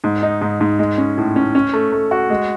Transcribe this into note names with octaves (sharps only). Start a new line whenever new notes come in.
G#2
D#4
G#2
G#2
G#3
C#4
A2
C#4
C#4
A3
A3
F#4
G#3